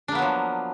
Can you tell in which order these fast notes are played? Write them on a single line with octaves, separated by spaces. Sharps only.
D4 A#3 B3 F#3 F3